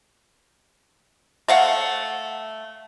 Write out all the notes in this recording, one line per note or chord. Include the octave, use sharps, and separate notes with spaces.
A3 F5 F#5